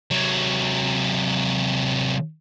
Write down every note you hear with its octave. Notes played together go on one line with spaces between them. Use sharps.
C3 F#3